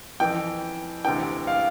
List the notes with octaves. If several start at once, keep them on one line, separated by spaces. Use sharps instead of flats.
F2 E3 G5
D2 C3 E3 G5
F5